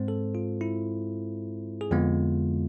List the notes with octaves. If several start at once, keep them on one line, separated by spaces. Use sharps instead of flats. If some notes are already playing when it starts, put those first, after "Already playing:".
Already playing: G#2 G#3 C4 C5
A4
F4
E4
G#4
F2 D3 G#3 B3 F4